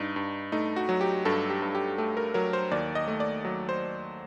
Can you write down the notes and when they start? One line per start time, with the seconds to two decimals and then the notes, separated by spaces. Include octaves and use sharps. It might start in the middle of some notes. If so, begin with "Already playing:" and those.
Already playing: G2 D#4
0.16 G2
0.52 A3 D#4
0.76 F#4
0.89 F#3
1.01 G4
1.25 G2 A4
1.50 G4
1.62 G2
1.75 G4
1.98 A3 G4
2.17 A#4
2.34 F#3 A#4
2.53 C5
2.71 D#2 D5
2.95 D#5
3.08 A3
3.20 D5
3.45 F#3
3.69 C5